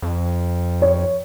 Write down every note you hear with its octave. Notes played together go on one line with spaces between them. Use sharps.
F2
C#5